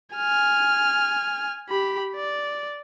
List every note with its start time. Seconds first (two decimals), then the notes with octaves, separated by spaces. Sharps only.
0.16 G#5 F6
1.69 G4 B5
2.15 D5